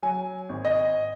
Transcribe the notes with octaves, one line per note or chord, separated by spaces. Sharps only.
F#3 G#5
G#1
D#5